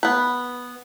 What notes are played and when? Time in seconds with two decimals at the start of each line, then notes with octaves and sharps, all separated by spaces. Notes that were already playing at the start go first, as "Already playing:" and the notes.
0.03 B3 B4